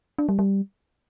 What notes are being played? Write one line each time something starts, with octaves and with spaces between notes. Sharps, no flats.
D4
G3
G3